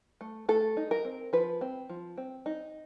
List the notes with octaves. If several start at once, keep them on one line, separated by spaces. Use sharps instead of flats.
A3
A3 A4
D#4
A#4
C4
F3 B4
C4
F3
C4
D#4